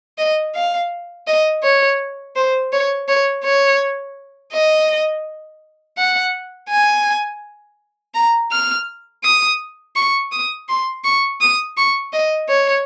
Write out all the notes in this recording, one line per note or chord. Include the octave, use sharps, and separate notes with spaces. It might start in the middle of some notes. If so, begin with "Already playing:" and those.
D#5
F5
D#5
C#5
C5
C#5
C#5
C#5
D#5
F#5
G#5
A#5
F6
D#6
C#6
D#6
C6
C#6
D#6
C#6
D#5
C#5